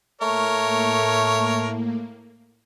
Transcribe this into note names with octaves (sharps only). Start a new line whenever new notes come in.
A2 A3 A#3 A#4 C#5